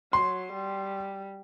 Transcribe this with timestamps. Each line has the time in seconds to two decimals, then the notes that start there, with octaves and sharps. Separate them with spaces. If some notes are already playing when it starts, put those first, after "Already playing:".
0.13 F#3 C6
0.53 G3